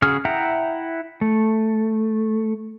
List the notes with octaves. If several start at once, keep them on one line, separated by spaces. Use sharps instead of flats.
C#3 F#4 G#4 F6
E4 E5 F#5 G5 A#5
A3